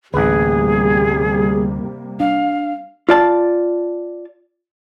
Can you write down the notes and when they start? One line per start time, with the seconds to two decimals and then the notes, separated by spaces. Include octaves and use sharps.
0.14 A1 D2 C3 G3 A#3 G#4 B4
2.20 D4 F5
3.09 F4 D5 A5